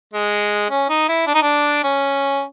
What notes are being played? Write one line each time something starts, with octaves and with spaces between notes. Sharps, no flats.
G#3
C#4
D#4
E4
D4
D#4
D4
C#4